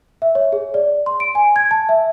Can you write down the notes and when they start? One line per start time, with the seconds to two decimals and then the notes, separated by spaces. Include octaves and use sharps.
0.22 E5
0.35 C#5
0.52 G#4
0.74 D5
1.06 C6
1.20 D7
1.35 G#5
1.56 G#6
1.71 A5
1.89 E5